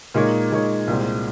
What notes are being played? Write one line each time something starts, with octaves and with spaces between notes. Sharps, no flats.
A#2 G#3 D#4 A#4 C#5
A#2 G#3 D#4 A#4 C#5
C2 A#2 G#3 C4